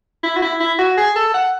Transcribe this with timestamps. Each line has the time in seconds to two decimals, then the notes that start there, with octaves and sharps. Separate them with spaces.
0.24 E4
0.36 F#4
0.42 E4
0.60 E4
0.79 F#4
0.97 G#4
1.16 A4
1.34 F#5